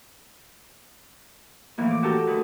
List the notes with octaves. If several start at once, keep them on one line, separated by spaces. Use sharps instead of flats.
A2 E3 F3 A#3
D6
F#4 G4 A4 A#4
D2 B4